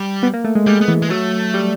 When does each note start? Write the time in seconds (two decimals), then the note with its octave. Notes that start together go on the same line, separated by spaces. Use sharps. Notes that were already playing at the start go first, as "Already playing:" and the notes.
Already playing: G3
0.23 B3
0.34 A#3
0.44 A3
0.55 G#3
0.66 G3 G#3
0.81 B3
0.88 E3
1.02 G#3
1.10 F#3 A3
1.54 G3